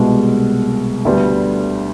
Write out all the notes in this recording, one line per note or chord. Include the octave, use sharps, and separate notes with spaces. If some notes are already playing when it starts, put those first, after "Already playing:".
Already playing: C2 B2 G#3 B3
D2 D3 G3 B3